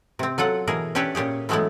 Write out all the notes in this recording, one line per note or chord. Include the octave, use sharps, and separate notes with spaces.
C3 C4
F#3 F4 A4 F#5
B2 E3 G#4 A#4
C#4 D4 G4 B4 C#5 E5
A#2 C#4 G4 G#4
E3 F#3 G#3 A3 B3 E4